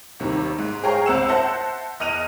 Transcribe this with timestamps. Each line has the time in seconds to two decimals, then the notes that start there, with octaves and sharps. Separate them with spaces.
0.20 D#2 C3 D#3 G3
0.59 G#2
0.83 G#4 C5 C#5 F5 G5 A#5
1.06 C#2 C4 F#5 E6 E7
1.28 C5 E5 F#5 A5 G6 A#6
2.00 E2 D#5 F6 F#6 D#7 F7